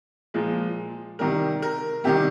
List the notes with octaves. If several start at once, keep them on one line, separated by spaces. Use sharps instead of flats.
A#2 F3 G#3
C3 D#3 G3 A#4
A#4
C3 D#3 G3 G4